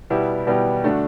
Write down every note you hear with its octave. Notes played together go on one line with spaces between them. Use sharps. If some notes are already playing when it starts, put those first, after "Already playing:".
B2 G3 B3 E4 G4
B2 G3 B3 E4 G4
D3 A3 D4 F#4